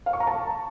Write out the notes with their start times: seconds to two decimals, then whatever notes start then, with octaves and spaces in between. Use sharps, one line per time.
0.06 F5
0.13 C#6
0.20 A#5
0.27 A5